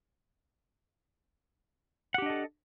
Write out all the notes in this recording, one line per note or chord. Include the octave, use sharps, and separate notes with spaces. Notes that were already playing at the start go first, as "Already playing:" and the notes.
D4 G4 A4 D#5 F#5